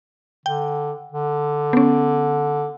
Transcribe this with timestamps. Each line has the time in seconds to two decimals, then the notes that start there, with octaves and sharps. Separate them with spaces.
0.46 D3 G5
1.12 D3
1.73 B3 C#4